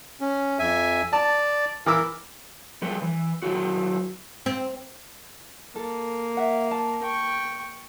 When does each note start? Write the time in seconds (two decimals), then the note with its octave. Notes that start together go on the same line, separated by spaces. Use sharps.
0.21 C#4
0.59 F2 E5 G#5
1.13 D5 A5
1.86 E3 A#4 D6 E6
2.82 F3 G3 A4 B4
3.02 E3
3.42 D#3 F#3 E4 F#4
4.46 C4
5.76 A#3 A4
6.37 E5 F#5
6.71 A5
7.03 G5 C#6